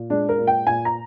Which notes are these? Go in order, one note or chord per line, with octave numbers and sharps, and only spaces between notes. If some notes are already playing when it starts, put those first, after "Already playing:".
Already playing: A#2
G#3 D4
A#4
A#2
G5
A#2 G#5
A#5